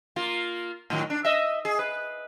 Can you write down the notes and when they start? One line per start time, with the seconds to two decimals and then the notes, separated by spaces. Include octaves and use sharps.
0.16 A#3 F4
0.90 A2 D#3 F#3
1.10 D4
1.25 D#5 E5
1.65 G#4
1.79 B4